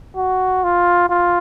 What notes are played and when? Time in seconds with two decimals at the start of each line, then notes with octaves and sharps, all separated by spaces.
0.16 F#4
0.64 F4
1.10 F4